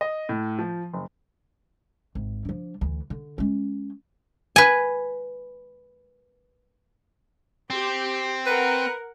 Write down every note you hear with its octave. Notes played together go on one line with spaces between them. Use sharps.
D#5
A2
F3
F#1
G#1
F3 D4
D2 E3
D3
G#3 C#4
B4 G#5
C4 G4
A#4 B4 F#5